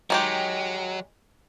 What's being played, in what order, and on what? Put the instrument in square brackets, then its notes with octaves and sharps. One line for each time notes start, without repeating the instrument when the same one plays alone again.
[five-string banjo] D#3 G#3 G4 [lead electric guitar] F#3